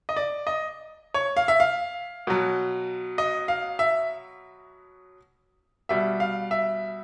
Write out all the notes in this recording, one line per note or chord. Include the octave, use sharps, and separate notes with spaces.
D#5
D5
D#5
C#5
F5
E5
F5
B2 F#3
D#5
F5
E5
B2 G3 E5
F5
E5